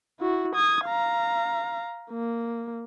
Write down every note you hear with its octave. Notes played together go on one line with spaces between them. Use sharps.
E4 F#4
D#6 G#6
F5 A#5
A#3